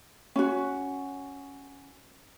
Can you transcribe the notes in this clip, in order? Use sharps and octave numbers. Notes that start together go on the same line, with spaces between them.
C#4 F#4